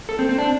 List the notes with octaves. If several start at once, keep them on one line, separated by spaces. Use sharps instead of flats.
A4
C4
C4
D4